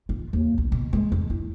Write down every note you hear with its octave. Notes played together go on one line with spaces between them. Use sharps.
F4
D#2
B1
B2
G#3
F2
E4